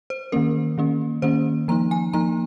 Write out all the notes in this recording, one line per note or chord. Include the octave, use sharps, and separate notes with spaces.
C5
D#3 A#3 C#4 A#4
D#3 A#3 C#4
D#3 A#3 C#4 C5
F3 A#3 D#4 A#5
G#5
F3 A#3 D#4 A#5